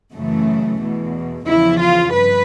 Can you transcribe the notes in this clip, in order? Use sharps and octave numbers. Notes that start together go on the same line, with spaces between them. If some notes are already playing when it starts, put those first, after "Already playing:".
F#2 C#3 E3 A3
E2 B2
E2 C#3 F3 E4
F4
G2 B4